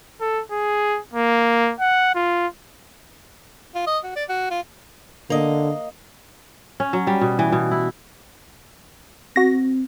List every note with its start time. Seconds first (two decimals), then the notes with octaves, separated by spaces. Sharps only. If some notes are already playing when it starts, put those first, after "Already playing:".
0.21 A4
0.51 G#4
1.14 A#3
1.80 F#5
2.15 F4
3.75 F4
3.87 D#5
4.04 F#4
4.16 D5
4.29 F#4
4.50 F4
5.30 D3 A#3 D#5
6.80 C#4
6.93 F#3
7.07 G3
7.21 B2
7.39 E3
7.52 B2
7.71 E4
9.36 C4 F#4 A#6